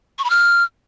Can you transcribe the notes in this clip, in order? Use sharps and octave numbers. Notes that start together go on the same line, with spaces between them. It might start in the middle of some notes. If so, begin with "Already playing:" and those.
C#6
B5
F6